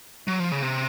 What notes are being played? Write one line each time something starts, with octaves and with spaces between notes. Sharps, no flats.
F#3
F3
C#3
C3